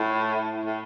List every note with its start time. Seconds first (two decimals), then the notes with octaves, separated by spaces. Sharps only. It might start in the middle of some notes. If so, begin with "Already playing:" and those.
Already playing: A2
0.66 A2